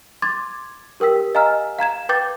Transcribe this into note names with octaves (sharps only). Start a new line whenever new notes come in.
C6 D6 G#6 A6
G4 A#4 G5 E6 B6
D#5 F5 G#5 A#5 E6 F6
F5 A#5 G#6 E7
B4 G5 D6 G6 A6